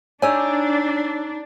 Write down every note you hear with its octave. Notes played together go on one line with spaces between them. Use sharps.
D4 D#4 G4 C#5 D5 G#5 E6